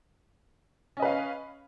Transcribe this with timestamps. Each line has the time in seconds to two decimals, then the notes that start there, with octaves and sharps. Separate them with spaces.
0.97 C#4
1.00 D#5
1.02 B4
1.05 F5
1.08 C#5